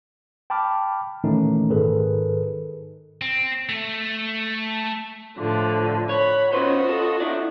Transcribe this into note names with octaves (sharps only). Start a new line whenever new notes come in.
G5 A5 B5 D6 F6
A#2 D#3 E3 A3 C#4 D#4
G#2 D#3 G#4 A4 B4
C4
A3
A2 D3 F3
C#5 F#5 B5
C#4 F4 F#4 B4 C5 D#5
A4
D4 E4 D5